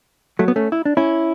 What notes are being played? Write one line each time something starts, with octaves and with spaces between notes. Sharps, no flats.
F#3 A3
B3
A3 C#4
E4
D4
C#4 E4